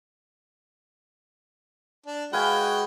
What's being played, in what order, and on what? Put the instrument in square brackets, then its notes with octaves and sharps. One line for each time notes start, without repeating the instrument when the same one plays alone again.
[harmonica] D4
[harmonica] G#3 F#4 G5 [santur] B4 F5 G#5